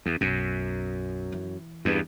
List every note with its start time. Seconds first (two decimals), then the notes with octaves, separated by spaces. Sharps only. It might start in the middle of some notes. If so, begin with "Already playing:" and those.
0.06 E2
0.21 B1 F#2
1.32 E3
1.85 E2 G2